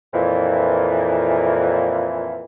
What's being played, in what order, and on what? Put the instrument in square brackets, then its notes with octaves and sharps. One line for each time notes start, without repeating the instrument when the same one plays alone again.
[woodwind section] F2 A#2 E3